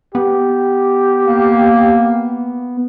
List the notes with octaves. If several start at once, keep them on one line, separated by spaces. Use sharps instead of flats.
B3 G4
A#3